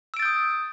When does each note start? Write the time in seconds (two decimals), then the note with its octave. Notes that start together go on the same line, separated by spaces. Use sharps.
0.14 E6
0.17 D7
0.19 A6
0.22 G6
0.25 D#6